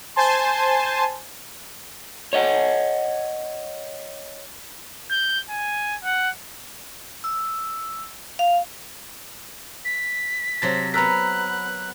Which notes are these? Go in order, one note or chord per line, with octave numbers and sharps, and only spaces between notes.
C5 G#5 A5 C6
C#5 D#5 F#5
G6
G#5
F#5
E6
F5
B6
C3 F#3 A5 A6 A#6
B3 A#4 A#5 E6 F#6 B6